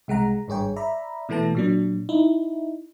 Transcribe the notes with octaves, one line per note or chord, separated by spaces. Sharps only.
C2 G#3 F#5 A#5
G#1 G2 G#4 C#5 G5
D5 E5 A#5 B5
B2 E3 A3 B3 A5 A#6
A#2 F#3 D4
D#4 E4